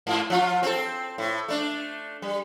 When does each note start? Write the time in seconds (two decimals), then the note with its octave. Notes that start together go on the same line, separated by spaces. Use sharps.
0.07 G#2 F4
0.30 F3 F4
0.63 C4 A4
1.18 A2
1.48 A3 D4
2.22 G3